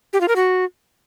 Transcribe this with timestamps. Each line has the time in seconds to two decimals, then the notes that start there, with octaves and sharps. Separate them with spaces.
0.13 G4
0.21 F4
0.28 A#4
0.36 F#4